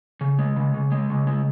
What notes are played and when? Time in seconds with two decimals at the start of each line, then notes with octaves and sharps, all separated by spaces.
0.21 C#3
0.39 G#3
0.56 C#3
0.74 C#3
0.91 G#3
1.10 C#3
1.27 G#3